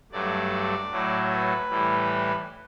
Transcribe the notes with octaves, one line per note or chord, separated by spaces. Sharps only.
G2 F#3 A3 D5
A2 F#3 A3
B4
A2 E3 G3